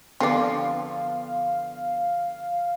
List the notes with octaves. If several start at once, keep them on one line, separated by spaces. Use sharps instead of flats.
D3 F3 B3 G4 D5 F5 C6 C7